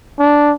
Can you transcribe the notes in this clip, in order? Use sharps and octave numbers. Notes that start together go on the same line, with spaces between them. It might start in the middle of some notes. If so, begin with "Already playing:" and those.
D4